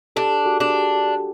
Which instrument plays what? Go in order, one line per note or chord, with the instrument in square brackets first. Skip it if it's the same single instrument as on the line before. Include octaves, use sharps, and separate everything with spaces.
[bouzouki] D4 [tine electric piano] G4 A4
[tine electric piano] F#4 G#4
[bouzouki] D4
[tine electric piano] G4